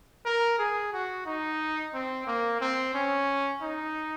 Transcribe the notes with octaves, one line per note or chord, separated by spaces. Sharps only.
A#4
G#4
F#4
D#4
C4
A#3
C4
C#4
D#4